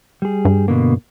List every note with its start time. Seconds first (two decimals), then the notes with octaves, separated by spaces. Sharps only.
0.22 G3 G#4
0.45 G2
0.68 B2 D3 A#3